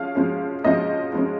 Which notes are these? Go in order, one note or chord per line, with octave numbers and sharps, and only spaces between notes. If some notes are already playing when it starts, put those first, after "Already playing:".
Already playing: F3 G#3 C#4 F5
F3 G#3 C#4
F3 G#3 C#4 D#5
F3 G#3 C#4